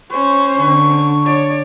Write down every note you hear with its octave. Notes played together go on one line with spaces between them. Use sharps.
C#4 C5 C#6
D3
C#5 D5